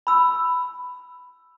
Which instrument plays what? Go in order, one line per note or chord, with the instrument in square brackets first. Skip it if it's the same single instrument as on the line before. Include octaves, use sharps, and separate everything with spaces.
[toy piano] B5 E6